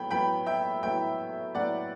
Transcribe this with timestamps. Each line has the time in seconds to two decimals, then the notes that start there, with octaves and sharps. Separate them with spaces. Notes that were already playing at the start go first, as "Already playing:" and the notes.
Already playing: A2 F#3 B3 G5 B5
0.11 A2 F#3 B3 G5 B5
0.47 E5 G5
0.83 A2 F#3 B3 E5 G5
1.54 A2 F#3 B3 D5 F#5